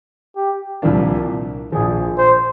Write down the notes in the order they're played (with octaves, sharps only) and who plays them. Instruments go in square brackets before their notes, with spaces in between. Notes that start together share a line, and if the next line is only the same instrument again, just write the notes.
[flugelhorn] G4
[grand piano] C2 A#2 F3 A#3 D4
[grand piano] A#1 A#2 F3 [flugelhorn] G#4
[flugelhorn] C5